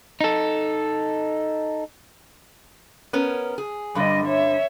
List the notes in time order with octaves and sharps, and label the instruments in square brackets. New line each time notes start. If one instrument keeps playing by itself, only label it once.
[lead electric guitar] D#4 A4
[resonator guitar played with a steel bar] B3 C#4 A#4
G#4
[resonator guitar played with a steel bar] G2 D3 [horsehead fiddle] G3 D#5
[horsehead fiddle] C#5 E5